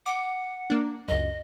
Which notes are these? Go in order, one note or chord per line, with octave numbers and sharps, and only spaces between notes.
F#5 D6
A#3 D4
C#2 F#2 D#5